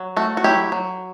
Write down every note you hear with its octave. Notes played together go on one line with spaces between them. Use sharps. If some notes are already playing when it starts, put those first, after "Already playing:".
Already playing: F#3
A3 F#4
F#4
F#3 E4 G4
F#3